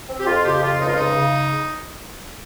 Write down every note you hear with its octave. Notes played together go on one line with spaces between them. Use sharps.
C4
G4
F2 F4
C#3 G4
F2 F4
C#2 D#4
F4
C#3 D#4
C#3